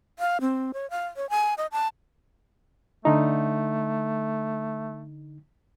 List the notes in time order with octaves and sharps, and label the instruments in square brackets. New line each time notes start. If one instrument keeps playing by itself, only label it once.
[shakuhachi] F5
C4
C#5
F5
C#5
G#5
D#5
A5
[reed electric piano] D3 D#4 [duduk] A3